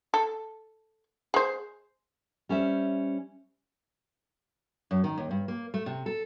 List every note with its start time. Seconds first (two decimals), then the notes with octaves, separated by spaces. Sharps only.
0.14 A4
1.34 G#3 C5
2.49 G3 C#4 C5 E5
4.91 F#2
5.04 D#3
5.18 D#2
5.31 G2
5.48 A#3
5.74 A3
5.86 C3
6.06 A4